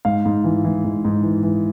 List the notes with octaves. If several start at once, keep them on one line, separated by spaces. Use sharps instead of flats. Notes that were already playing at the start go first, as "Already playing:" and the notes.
G#2 F5
G#2
E3
E3
G#2
G#2
E3
E3